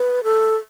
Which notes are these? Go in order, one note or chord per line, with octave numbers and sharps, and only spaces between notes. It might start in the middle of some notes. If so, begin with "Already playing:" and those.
Already playing: B4
A4